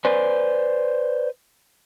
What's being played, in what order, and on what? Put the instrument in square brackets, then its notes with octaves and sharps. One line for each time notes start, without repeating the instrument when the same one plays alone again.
[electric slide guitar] B4 C5 D5 G#5